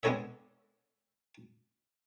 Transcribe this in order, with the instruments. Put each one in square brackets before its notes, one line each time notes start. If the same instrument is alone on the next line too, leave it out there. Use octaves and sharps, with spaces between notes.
[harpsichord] G#3 B3 D4 A4 C#5 E5